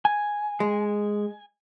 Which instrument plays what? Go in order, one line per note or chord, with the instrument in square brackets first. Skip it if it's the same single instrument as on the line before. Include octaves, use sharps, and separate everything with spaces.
[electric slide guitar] G#5
[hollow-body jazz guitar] G#3